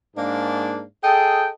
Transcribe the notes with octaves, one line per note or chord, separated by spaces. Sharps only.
G#2 A#3 D4
G#4 A4 D#5 G5